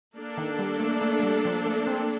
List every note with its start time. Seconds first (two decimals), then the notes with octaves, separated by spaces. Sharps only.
0.17 A#3 D4 A4
0.38 D#3
0.59 G3
0.80 A3
1.02 A3
1.20 A3
1.23 G3
1.45 F3
1.66 A3
1.87 C4